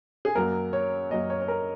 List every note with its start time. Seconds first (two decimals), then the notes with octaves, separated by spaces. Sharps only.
0.25 G#4
0.35 F#2 F#3 A#3 A#4
0.73 C#5
1.11 F#2 F#3 A#3 D#5
1.30 C#5
1.41 C#5
1.48 A#4